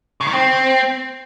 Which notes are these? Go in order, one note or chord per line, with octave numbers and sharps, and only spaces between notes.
C#3
D#3
C4